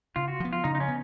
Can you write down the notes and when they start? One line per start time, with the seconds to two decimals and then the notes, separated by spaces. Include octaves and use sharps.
0.16 C#3 F4
0.28 F#4
0.40 F3 B3
0.53 F4
0.64 C#3 D#4
0.75 D#4
0.80 C#4
0.88 B3